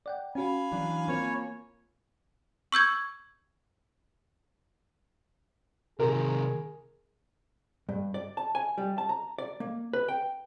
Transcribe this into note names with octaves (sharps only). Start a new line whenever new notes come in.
D5 F#5 G5
C#4 F#4 F5 G#5 B5
E3 F#3 D4
A#3 C4 F4 C#5
C#6 E6 G6 G#6
C3 D#3 G#4 A#4
G2
D5
A5
G#5
G3
A5
A#5
D5
A#3
B4
G5